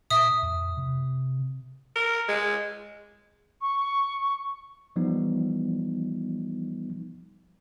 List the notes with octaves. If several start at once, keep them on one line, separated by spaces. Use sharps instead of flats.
A#2 E5 D#6
F2
C3
A#4
G#3
C#6
E3 F3 G3 B3 D#4